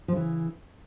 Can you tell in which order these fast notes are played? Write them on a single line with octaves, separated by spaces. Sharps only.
F3 C#3 E3